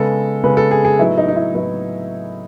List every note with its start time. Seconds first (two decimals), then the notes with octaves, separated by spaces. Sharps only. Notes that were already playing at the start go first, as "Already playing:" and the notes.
Already playing: C#3 G#3 B3 A4
0.44 C#3 G#3 B3 B4
0.57 A4
0.71 G#4
0.85 G#4
0.99 A2 F#3 B3 D#4 E4
1.18 D#4
1.28 D#4
1.36 E4
1.54 A2 F#3 B3 D#4